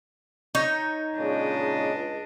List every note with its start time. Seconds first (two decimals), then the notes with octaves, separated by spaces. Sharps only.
0.55 D#4 C#5
1.18 A#2 C#3 G#3 D4 D#5
1.93 C#2